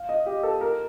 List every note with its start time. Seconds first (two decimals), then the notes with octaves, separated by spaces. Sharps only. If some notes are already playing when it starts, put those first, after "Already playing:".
Already playing: F5
0.09 D#5
0.26 G4
0.43 A4
0.61 A#4